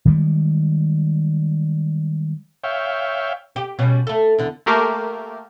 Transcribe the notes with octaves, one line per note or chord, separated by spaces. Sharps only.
D#3 G3 G#3
C#5 E5 F5 G5
G4
B2 G3 C#4
A3 A4
E2 D3
A3 A#3 G4 A#4